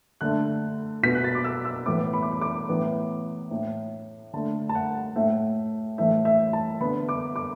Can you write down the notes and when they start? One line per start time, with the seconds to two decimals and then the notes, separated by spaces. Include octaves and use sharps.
0.21 D3 A3 F#6
1.03 B2 B3 B6
1.15 F#6
1.24 A6
1.35 D6
1.44 E6
1.65 E6
1.86 A2 E3 B3 D6
2.13 B5
2.22 D6
2.32 B5
2.41 D6
2.69 A2 E3 B3
3.51 A2 A3
4.33 D3 A3 A5
4.69 A5
4.75 F#5
5.16 A2 A3 E5
5.98 A2 E3 A3 E5
6.25 E5
6.53 A5
6.80 D3 B3 B5
7.09 D6
7.36 D6